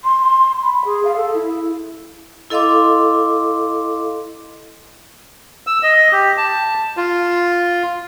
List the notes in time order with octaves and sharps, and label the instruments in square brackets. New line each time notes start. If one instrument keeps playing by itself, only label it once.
[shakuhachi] C6
C6
B5
G#4
F5
A4
E4
[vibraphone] E4 A4 D#5 F5 C6 D6
[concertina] E6
D#5
G4
A5
F4